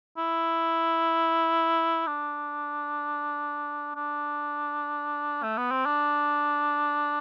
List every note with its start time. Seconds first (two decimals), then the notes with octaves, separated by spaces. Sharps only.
0.17 E4
2.07 D4
3.96 D4
5.43 A3
5.58 B3
5.71 C4
5.86 D4